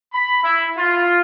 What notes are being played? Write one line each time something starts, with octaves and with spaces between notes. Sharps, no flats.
B5
E4
F4